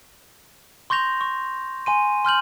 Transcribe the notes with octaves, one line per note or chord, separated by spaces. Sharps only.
C6 C#6 G6 A#6 F7
C#6
G#5 C6 D#7
C6 F6 G6 F#7